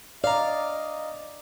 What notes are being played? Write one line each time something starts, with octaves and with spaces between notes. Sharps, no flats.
D5 D#5 F5 A#5